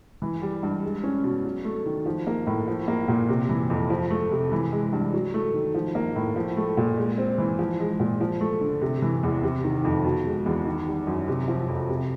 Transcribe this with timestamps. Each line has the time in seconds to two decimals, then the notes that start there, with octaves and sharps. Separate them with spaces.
0.22 E3
0.42 G3
0.63 G2
0.83 G#3
1.03 C#4
1.24 B2
1.44 F#3
1.65 A3
1.86 D#3
2.06 F3
2.27 A#3
2.47 A2
2.67 F3
2.88 A#3
3.08 A#2
3.29 C3
3.49 E3
3.70 F2
3.90 F3
4.10 A3
4.31 C3
4.52 E3
4.72 G#3
4.93 G2
5.14 F#3
5.34 A3
5.54 D#3
5.74 F3
5.95 A#3
6.16 A2
6.36 F3
6.57 A3
6.77 A#2
6.97 G#3
7.18 C4
7.38 E3
7.59 F3
7.79 G#3
8.00 A#2
8.21 F3
8.41 A3
8.61 D3
8.81 C3
9.02 E3
9.23 E2
9.43 C3
9.64 D#3
9.85 F2
10.04 B2
10.25 G#3
10.46 E2
10.66 D#3
10.87 G3
11.07 F#2
11.28 C3
11.48 F3
11.68 F2
11.89 C3